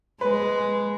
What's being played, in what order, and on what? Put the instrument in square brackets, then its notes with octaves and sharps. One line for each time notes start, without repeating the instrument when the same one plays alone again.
[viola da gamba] G#3 [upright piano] B4